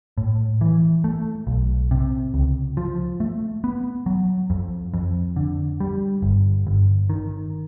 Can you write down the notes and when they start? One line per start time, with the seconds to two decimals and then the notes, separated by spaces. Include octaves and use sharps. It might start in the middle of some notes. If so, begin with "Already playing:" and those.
0.18 A2
0.61 E3
1.04 A3
1.47 B1
1.91 C3
2.34 C#2
2.77 F3
3.20 A3
3.64 B3
4.06 F#3
4.50 F2
4.94 F2
5.36 D3
5.80 G3
6.22 G1
6.67 G1
7.10 D#3